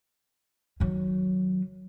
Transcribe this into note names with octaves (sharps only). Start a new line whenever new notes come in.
D#3 F#3